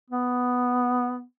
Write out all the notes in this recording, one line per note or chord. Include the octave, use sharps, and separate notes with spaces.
B3